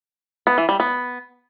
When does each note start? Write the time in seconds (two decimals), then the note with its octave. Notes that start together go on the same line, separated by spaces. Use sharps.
0.47 B3
0.58 E3
0.69 G3
0.80 B3